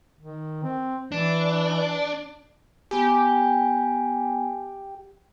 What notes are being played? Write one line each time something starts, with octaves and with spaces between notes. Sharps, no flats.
D#3
C4
E3 D4
B3 G4 G#5